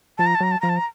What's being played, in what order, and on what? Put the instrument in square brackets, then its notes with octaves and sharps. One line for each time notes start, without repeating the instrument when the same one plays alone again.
[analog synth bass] F3 [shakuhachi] A5
[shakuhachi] A#5
A5
[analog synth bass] F#3 [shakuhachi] A#5
[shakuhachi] A5
[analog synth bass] F3 [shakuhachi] A#5
[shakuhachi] A5
A#5